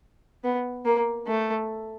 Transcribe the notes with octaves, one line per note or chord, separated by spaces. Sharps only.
B3
A#3
A3